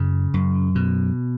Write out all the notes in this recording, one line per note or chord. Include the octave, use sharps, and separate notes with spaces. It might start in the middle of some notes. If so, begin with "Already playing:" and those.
Already playing: F#2 C#3
F#2
B2